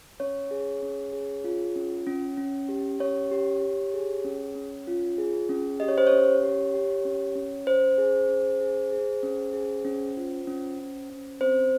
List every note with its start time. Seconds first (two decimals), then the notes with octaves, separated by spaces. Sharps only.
0.20 C#4 C#5
0.51 G#4
0.82 C#4
1.13 G#4
1.44 F4
1.76 C#4
2.07 C#4
2.37 C#4
2.69 G4
3.00 C#4 C#5
3.31 G4
3.62 G4
3.94 G#4
4.25 C#4
4.55 C#4
4.87 F4
5.18 G#4
5.49 C#4
5.80 G4 D#5
5.88 C#5
5.98 C5
6.07 C#5
6.12 C#4
6.43 G4
6.74 G4
7.05 C#4
7.35 C#4
7.67 C#4 C5
7.98 G#4
8.29 C#4
8.60 G#4
8.92 G#4
9.23 C#4
9.53 G#4
9.85 C#4
10.17 F4
10.47 C#4
10.79 C#4
11.10 C#4
11.41 C4 C5